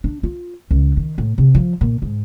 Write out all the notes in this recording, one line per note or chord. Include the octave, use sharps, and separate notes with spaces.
D4
F4
C#2
D#3
A2
C3
F3
A#2
G#2